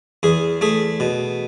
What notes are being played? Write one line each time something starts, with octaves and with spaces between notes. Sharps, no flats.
E2 G#4
A3 G#4
B2